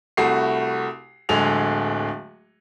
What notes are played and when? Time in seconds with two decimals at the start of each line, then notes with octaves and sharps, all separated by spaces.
0.17 C2 A3 F#4 C7
1.29 D1 D3 G#3 G#4 F7